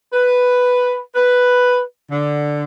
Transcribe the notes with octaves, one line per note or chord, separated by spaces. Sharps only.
B4
B4
D3